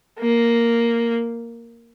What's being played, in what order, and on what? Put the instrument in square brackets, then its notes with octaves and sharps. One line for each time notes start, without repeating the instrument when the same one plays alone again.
[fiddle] A#3